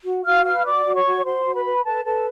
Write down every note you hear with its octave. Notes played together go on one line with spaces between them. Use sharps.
F#4
F#4 F5 F6
B4 F5 F6
F#4 D5 D6
F#4
C#5 C#6
F#4
F#4 C5 C6
F#4
B4 B5
B4
A4 B4 A5
A4 B4 A5